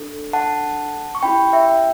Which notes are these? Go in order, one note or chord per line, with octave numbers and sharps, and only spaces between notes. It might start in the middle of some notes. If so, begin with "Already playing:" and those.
Already playing: D4 A4
F#5 A5
C#6
C#4 E4 G4 G5 B5
E5 G5